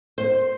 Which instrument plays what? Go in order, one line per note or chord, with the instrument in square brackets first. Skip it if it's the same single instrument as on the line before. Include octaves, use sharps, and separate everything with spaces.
[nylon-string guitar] C5